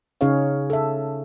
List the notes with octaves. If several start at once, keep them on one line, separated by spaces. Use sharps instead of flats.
C#3 C#4 D#4 G#4 C#5 F5
A4 E5